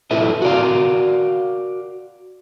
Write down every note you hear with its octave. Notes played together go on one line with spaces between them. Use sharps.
E4 F4 A4 B4 E5
F#4 A#4 D5 F5